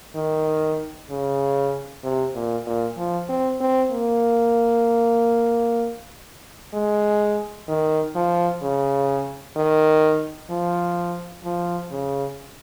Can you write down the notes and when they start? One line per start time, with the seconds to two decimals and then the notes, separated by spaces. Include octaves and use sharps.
0.16 D#3
1.10 C#3
2.04 C3
2.35 A#2
2.67 A#2
2.97 F3
3.29 C4
3.61 C4
3.92 A#3
6.74 G#3
7.68 D#3
8.15 F3
8.62 C#3
9.57 D#3
10.51 F3
11.45 F3
11.92 C#3